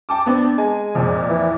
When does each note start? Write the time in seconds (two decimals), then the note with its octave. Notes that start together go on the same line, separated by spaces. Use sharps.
0.09 G5 A5 D6
0.26 B3 C4 D4
0.58 G#3 G#5
0.95 F2 A#2
1.29 E3